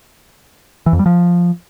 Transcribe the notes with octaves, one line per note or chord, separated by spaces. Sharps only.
E3
F2
G3
F3